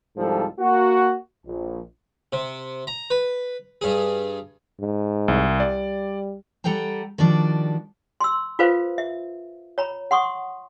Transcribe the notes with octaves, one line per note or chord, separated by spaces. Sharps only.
C2 G#2 F3 G3 A4
A#3 F#4
A#1
C3
A#5
B4
G2 G#4
G#2
C2
G3 D5
G3 A4 F#5 G5 A#5
D#3 F3 G3 D4 F#4 D5
C6 E6
F4 A4 B4 C5 F5
E5
C#5 A#5 B5
F#5 C6 C#6 D#6